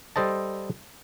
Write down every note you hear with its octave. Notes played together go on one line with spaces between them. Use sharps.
G3 A4 C5 D#5 A5